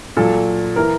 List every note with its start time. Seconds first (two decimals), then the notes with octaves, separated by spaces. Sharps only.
0.17 A#2 F#3 A4
0.76 E3 A#4